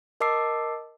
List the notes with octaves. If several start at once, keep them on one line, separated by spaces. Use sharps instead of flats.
A#4 D#5 A5 D6 E6 C7